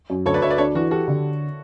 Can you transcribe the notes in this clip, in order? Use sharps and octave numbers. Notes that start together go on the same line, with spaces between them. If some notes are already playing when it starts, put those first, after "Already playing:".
F#2
D2 A4 C#5
B4 D5
D2 C#5 E5
B4 D5
D4 A4 C#5
E3 F#4
F#4 G4 A4
D3